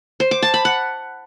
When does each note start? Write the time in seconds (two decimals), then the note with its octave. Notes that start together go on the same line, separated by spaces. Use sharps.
0.20 C5
0.31 D6
0.42 A5
0.54 B5
0.65 F#5